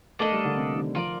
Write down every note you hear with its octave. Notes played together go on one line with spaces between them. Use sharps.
A3 A#3 D4 A4 D#5
G3
D3
C3
D#3
F3 F4 A#4 D5